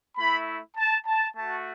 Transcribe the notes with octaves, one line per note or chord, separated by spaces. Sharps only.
A3 E4 B5
A5
A5
A3 F#4 A5